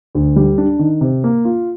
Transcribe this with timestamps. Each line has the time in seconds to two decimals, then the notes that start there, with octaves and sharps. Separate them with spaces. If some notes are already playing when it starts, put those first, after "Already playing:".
0.15 D2
0.36 G3
0.58 D4
0.79 D#3
1.01 C3
1.24 A#3
1.45 F4